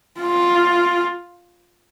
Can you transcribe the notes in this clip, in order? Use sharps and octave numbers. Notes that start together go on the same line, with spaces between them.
F4